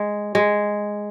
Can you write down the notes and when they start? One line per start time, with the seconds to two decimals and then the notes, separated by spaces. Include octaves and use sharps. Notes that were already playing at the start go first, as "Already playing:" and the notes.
Already playing: G#3
0.35 G#3